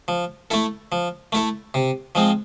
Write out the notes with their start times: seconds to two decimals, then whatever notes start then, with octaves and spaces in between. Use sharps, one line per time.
0.08 F3
0.50 A3 E4 A4
0.92 F3
1.32 A3 E4 A4
1.74 C3
2.15 F3 G#3 C4